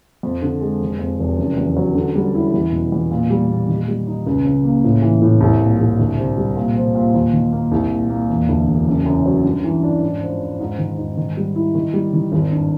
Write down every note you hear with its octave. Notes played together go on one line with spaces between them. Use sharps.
F2
D3
G#3
F1
F2
F1
F#1
E2
F#3
D3
G3
E4
E2
B2
E2
A#2
G3
A#2
D#3
G3
D#4
C#2
C#3
A#3
A2
E3
A2
C2
A#2
C2
D2
C3
G3
A#2
F3
A#2
D#2
D#3
A#3
C2
A#2
A#3
E1
D2
E1
F#1
F#2
F#3
G2
E3
D4
G#2
F3
G#2
G#2
D#3
G#2
D#3
G3
E4
D#3
G3
D#3
G#1
G2